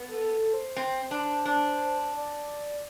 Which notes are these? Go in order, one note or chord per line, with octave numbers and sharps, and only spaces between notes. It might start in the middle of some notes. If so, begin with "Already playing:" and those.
Already playing: B3
A4
A4
C5
C4
D4
D4
D5